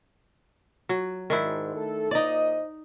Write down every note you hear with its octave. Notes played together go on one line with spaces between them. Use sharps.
F#3
G#2 D#3 D4 E4
A3 A4
A#2 D#4 C5 D5 D#5